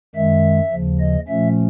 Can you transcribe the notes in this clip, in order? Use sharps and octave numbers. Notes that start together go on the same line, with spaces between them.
F#2 D#3 G#3 E5
D#2 C#3 F3
D#5
A#2 F3 A3 C#4 E5